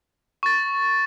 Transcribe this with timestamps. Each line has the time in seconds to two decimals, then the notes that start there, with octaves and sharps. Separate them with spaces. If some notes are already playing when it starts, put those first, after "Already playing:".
0.43 C#6 A6